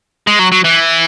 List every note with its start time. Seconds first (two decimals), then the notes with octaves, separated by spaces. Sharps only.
0.27 G#3
0.39 F#3
0.52 F#3
0.64 E3